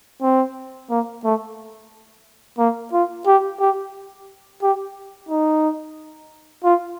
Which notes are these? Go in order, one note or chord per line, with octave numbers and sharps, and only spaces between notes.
C4
A#3
A3
A#3
F4
G4
G4
G4
D#4
F4